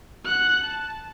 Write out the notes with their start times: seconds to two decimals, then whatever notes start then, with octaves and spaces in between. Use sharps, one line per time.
0.24 F#5 F#6
0.64 A5